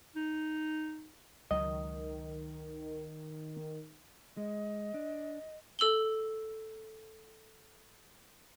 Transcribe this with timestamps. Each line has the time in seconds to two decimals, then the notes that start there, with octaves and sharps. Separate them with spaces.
0.16 D#4
1.51 C#2 D#3 F#3 G#3 D#5
4.37 G#3 D#5
4.94 D4
5.79 A4 E6 F#7 G7